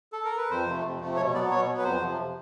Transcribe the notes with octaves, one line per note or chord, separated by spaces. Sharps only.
A4
A#4
B4
F2 C5
C3 F3 A3
F2
C3 F3 A3
B2 C#5
F#3 B3 D5
B2 C#5
F#3 B3
B4
F2 C5
C3 F3